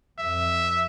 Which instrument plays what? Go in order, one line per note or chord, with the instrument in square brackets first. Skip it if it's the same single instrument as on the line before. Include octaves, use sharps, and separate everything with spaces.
[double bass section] F2 [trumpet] E5